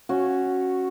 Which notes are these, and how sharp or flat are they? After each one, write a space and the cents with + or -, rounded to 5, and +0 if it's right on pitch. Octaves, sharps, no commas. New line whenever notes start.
C#4 -10 F#4 +0